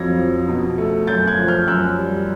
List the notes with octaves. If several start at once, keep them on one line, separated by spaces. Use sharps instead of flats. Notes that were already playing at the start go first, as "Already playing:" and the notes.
Already playing: F2 F#3 G#6 A#6
F3
B2
A3
F#2 G6 A6
F#6 G#6
F3
F6 G6
F#2 E6 F#6
G3